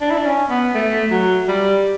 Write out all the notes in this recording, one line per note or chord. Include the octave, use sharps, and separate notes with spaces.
D4
E4
D4
C#4
B3
A3
F#3
G3